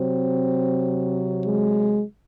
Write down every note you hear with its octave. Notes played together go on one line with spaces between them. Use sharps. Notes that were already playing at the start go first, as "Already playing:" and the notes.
Already playing: C3 F#3 C4
G#3